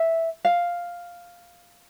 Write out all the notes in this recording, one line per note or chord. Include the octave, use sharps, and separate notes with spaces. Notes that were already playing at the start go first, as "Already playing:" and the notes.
Already playing: E5
F5